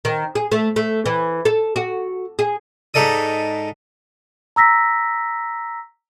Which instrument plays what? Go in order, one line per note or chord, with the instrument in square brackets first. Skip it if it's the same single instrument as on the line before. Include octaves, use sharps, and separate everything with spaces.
[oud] D#3
G#4
A3
A3
E3
A4
F#4
G#4
[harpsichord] G#2 D#4 A4 D5 D#6
[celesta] A#5 E6 A#6 B6